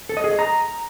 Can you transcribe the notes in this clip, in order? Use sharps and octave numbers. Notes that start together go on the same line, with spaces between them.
A4
D#5
G#4
D#5
A#5